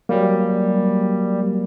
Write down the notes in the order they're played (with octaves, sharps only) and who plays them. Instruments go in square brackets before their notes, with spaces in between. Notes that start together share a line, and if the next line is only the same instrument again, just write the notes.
[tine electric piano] F#3 A#3 [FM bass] G3